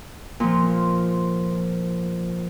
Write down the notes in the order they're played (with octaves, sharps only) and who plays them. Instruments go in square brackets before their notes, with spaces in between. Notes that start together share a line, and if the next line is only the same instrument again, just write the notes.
[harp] A#2 F3